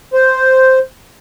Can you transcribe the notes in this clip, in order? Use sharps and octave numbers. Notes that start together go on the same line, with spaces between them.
C5